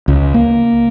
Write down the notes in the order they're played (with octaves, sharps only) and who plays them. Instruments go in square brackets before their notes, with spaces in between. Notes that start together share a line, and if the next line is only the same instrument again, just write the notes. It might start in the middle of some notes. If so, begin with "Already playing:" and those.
[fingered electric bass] C#2
A#3